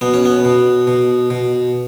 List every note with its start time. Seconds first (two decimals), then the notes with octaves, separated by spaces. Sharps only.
0.01 B2 B3
0.14 C#4
0.25 B3
0.45 B2
0.87 B2
1.30 B2